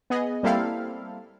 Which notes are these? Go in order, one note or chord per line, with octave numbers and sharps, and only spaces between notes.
B3 G#4 D#5
G3 A#3 C4 E4 A4 F5